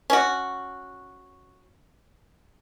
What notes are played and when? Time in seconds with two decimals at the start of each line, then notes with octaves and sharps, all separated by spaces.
0.10 C#4 F#4